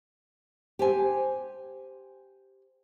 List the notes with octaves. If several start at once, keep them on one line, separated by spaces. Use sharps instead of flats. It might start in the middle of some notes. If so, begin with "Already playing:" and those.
G4 C5 G#5